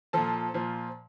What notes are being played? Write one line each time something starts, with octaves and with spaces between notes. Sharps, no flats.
A#2 F3 A4 A5
A#2 F3